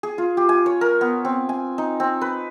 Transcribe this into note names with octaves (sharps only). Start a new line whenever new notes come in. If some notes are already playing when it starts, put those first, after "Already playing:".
G#4
F4
G4
G#5
C#5
A#4
B3
C4
G#5
D#4
C4
B4